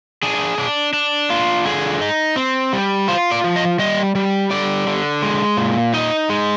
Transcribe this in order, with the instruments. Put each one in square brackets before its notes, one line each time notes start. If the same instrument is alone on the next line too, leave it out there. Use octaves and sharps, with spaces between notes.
[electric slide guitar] D4 G#4
D4
D4
F4
D3 G#4
D#4
C4
G3
F4 C5
D5
F3
D#5
G3 D#5
G3
D3 D5
D3
G#3
A#2
D#4 D#5
G#3